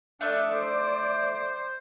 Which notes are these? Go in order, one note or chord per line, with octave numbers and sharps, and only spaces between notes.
A3 D4 A4 D5 E5 D#6
C5 D5